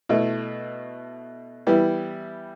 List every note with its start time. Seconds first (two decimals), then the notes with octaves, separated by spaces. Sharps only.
0.09 B2 A3 E4
1.67 E3 G3 B3 E4